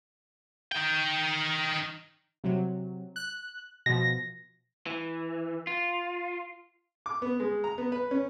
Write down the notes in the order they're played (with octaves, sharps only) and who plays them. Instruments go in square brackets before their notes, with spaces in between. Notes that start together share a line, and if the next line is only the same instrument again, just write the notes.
[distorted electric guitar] D#4 G5
[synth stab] C3 F#3
F#6
[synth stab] B2 F3 [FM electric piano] A#6
[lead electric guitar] E3
F4
[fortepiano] D6
B3
G#3
A#5
B3
B4
C#4